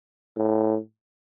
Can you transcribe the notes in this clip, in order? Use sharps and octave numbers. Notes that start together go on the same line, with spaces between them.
A2